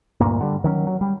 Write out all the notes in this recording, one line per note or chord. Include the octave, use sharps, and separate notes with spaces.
D2 G2 A#2 A#3
D3 G3
D#3 F#3 C#4
F#3
G3